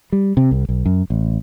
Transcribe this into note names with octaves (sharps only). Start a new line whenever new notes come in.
G3
C3
C2
B1
F#2
A1